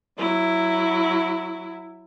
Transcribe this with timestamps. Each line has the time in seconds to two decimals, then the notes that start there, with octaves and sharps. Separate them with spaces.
0.19 F#3 E4